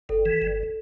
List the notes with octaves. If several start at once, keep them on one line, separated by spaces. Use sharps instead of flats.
G1 A4
E3
G1